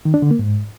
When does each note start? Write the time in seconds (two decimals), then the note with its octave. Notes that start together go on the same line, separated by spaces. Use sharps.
0.05 D#3
0.14 D4
0.22 D3
0.31 A#3
0.39 G#2